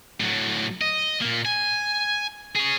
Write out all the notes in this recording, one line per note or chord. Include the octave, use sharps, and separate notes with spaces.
A2 F#3
D#5
A#2 A#3
G#5
G#4 C#5